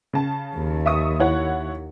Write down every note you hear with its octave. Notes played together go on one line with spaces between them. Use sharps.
C#3 A5
D#2
E5 C#6 D#6
E4 C#5 F#5